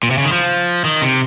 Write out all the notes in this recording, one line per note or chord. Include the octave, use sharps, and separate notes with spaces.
A#2
C3
C#3
D#3
F3
D#3
C3